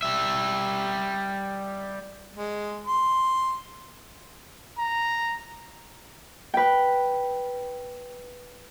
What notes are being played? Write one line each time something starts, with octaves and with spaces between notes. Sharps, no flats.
G3 E5
G#3
C6
A#5
B4 G5